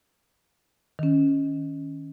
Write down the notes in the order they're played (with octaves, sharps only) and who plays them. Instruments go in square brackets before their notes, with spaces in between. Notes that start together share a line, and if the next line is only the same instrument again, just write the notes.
[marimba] D#3 C#4